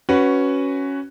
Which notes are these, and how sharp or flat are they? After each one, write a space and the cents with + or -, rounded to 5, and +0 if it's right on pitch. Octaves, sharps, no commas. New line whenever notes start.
C#4 +0 F#4 +10 B4 +0